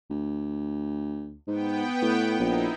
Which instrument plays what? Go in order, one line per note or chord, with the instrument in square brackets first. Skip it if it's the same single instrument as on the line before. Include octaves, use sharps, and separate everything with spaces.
[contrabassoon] D2
[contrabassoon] G#2 [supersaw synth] B3 G5
[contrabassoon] A2
[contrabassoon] A#1 [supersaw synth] D#4 E4